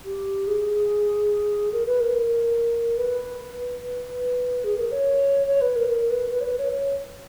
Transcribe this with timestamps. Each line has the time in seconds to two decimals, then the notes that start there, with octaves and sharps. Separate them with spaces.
0.05 G4
0.47 G#4
1.72 A#4
1.86 B4
2.00 A#4
2.14 A#4
2.97 B4
3.80 B4
4.64 G#4
4.77 A#4
4.91 C#5
5.47 C#5
5.61 B4
5.75 A#4
5.88 A#4
6.10 B4
6.31 B4
6.40 C#5
6.44 B4
6.58 C#5
6.72 C#5